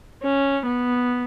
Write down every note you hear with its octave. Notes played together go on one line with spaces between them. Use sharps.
C#4
B3